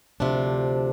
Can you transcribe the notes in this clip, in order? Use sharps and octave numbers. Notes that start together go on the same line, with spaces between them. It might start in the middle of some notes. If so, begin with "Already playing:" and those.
D2 C3 F3 D4